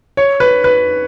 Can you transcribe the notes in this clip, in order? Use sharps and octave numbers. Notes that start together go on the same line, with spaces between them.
C#5
B4
B4